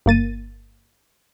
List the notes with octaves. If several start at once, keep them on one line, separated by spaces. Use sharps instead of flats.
G1 A#3 A6 D#7